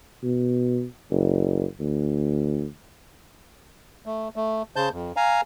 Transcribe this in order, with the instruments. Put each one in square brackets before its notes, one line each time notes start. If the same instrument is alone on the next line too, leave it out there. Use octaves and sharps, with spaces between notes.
[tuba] B2
F#1
D2
[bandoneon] A3
A3
C#3 C5 A5 G6
F2
F5 G#5 A#5